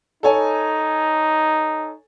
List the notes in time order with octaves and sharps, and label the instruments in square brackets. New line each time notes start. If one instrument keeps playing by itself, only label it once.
[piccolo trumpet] D#4 [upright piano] A4 C#5 G#5